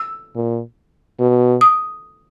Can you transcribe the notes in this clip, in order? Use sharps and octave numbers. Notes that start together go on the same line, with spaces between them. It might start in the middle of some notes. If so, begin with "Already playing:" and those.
Already playing: E6
A#2
B2
D#6